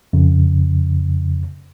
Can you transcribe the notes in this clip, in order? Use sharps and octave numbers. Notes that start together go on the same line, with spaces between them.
F2 C#3